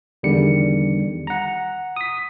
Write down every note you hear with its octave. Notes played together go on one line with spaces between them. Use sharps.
E2 D3 D#3 G3 C#7
F#5 A#5
D#6 B6